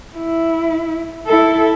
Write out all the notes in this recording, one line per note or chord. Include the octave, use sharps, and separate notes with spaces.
E4
E4 A4